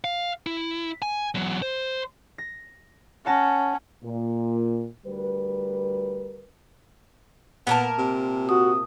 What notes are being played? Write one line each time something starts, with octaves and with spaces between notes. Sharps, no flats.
F5
E4
G#5
E2 F#3
C5
A#6
C#4 F#5 A5 A#6
A#2
D2 G3 A#4 B4
A#2 B3 A#4 A5
C3
F#4 D#6